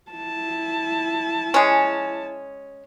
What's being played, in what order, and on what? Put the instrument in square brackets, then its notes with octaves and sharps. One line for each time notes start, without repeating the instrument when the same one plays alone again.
[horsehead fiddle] E4 A5
[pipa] G#3 C#4